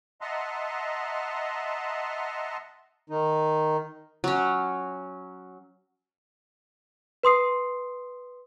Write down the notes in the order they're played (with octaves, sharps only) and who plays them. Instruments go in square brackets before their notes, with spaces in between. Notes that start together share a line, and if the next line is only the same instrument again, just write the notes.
[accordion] D#5 E5 F#5 A5 A#5 C6
[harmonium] D#3 D#4
[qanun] F#3 C#4
[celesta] B4 C6 D#6 C7